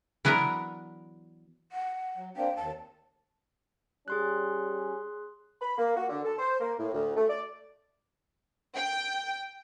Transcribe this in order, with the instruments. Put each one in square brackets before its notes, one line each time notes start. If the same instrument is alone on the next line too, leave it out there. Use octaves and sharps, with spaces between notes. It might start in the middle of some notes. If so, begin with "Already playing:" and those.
[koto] E3 F#3 B3 D4 A#4 A#5
[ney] F#5
[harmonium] F#3
[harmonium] A#3 C4 D4 [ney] G5
[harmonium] D#2 [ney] A5
[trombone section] G3 C#4 [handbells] G#4 C6 F#6
[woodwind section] B5
A#3
F#4
D3
A4
C5
A#3
A2
D2
A3
D5
[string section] G5